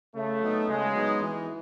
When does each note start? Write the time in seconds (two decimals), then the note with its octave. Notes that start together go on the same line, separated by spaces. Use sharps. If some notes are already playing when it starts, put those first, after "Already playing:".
0.15 C#3 A3
0.41 F#3 B3 D#4
0.68 C#3 G#3
0.94 F#3 B3 D#4
1.21 E3